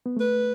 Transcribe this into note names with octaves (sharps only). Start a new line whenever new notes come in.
B3
A3 B4